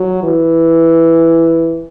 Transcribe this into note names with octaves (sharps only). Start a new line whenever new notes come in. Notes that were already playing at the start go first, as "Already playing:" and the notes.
Already playing: F#3
E3